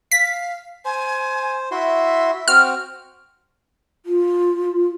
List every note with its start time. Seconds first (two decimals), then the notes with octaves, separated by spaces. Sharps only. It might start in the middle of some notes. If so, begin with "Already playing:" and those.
0.11 F5 B6
0.85 C5 G#5
1.71 E4 F#4 E5 C6
2.48 C4 F#4 F6
4.06 F4